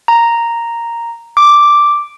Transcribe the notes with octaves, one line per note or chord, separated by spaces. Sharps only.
A#5
D6